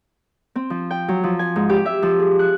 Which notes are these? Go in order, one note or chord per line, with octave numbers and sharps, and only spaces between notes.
C4
F3
G5
F#3
F3
G#5
G#2
G4
E5
F3
G#4
F#6